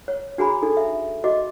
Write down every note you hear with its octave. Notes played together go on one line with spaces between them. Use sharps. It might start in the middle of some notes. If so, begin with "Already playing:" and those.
C#5
D4 F#4 G#4 G#5 A#5 B5
D4 D#4 A4
E5
F#4 D#5 D6